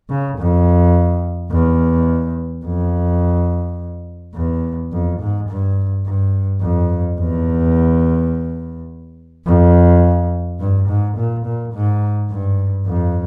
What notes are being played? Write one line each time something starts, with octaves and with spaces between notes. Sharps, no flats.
C#3
F2
E2
F2
E2
F2
G#2
G2
G2
F2
E2
F2
G2
G#2
A#2
A#2
G#2
G2
F2